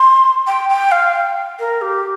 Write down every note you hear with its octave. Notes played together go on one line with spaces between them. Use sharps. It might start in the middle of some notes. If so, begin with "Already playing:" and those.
Already playing: C6
G5
G5
F5
A#4
G4